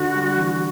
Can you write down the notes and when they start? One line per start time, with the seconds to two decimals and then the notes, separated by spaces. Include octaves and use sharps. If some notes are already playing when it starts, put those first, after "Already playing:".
Already playing: D3 F#4
0.15 G3
0.38 E3